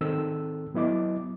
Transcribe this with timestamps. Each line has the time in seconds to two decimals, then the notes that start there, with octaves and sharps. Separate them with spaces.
0.01 D#3 C4 A4 E6
0.74 F#3 B3 E4 D#5 D6